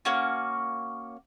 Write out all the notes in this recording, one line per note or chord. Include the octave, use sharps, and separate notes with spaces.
A#3 C#4 F#4